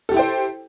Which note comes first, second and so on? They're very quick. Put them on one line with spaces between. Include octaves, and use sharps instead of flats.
A4 G4 E4 G5 C5